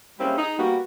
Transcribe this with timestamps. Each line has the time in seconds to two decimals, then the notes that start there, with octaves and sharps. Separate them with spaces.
0.19 G3 G#3 A#3 C4 C#4 E4
0.37 D#4 G#4
0.58 G3 A#3 B3 F#4